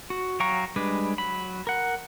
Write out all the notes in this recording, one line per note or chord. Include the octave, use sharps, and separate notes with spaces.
F#4
F#3 F5 G5 A#5 C#6
G3 G#3 D4 B4
F#3 B5
A#4 F#5